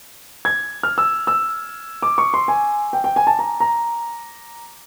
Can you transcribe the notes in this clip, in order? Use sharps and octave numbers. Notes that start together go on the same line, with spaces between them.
G#6
F6
E6
E6
D6
C#6
C6
G#5
G5
G5
G#5
A5
A#5
A#5